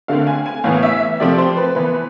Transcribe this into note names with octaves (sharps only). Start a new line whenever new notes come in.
D3 A3 C4 F5
G#5
G#5
A2 E3 B3 F5
E5
C3 F3 A3 C4 D5
C5
B4
E3 B3 B4